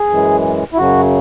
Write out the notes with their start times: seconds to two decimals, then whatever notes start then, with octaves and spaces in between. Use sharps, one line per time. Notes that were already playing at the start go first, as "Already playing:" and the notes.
Already playing: G#4
0.10 F#2 E3 G#3
0.73 E4
0.77 F#2 C#3 F#3 F#4